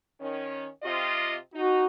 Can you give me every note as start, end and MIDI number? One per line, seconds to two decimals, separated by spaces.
0.21 0.68 51
0.21 0.68 61
0.83 1.36 48
0.83 1.36 65
0.83 1.36 75
1.54 1.86 63
1.54 1.86 66